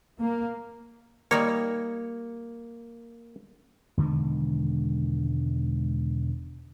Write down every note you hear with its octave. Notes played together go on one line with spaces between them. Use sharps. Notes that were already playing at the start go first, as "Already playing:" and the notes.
A#3
G3 A#3 D#4 C#5
E1 D3 D#3 G#3